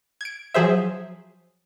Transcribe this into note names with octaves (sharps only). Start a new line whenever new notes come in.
G#6 D7
F3 F#3 G#4 C5 E5